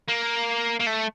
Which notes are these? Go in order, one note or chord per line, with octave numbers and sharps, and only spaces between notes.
A#3
A#3
A3